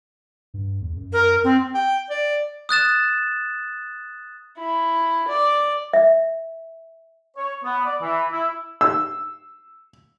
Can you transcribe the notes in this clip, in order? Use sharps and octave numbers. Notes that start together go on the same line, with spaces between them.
G2
E2
F#2
A#4
C4
G5
D5
D#6 F#6 A6 E7
E4
D5
E5
C#5
B3
D5
E3
E4
E6